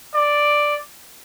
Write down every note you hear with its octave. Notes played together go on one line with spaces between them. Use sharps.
D5